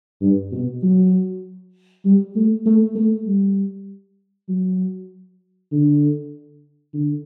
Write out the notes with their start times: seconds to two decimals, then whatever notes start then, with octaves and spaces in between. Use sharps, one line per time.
0.22 G2
0.52 B2
0.83 F#3
2.05 G3
2.36 A3
2.66 A3
2.96 A3
3.26 G3
4.49 F#3
5.72 D3
6.94 D3